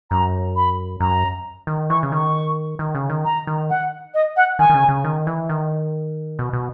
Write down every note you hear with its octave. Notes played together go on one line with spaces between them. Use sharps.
F#2 A#5
B5
F#2 A#5
D#3
E3 C#6
C#3
D#3 C#6
D#3
C#3
D#3
A#5
D#3
F#5
D#5
F#5
D#3 G#5
D#3
C#3
C#3
D#3
E3
D#3
B2
B2